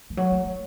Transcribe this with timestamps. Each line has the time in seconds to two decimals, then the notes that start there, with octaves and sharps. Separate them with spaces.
0.10 E3
0.17 F#3
0.32 A#3
0.46 A#3